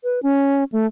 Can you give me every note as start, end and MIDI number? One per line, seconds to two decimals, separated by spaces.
0.04 0.20 71
0.23 0.64 61
0.72 0.86 57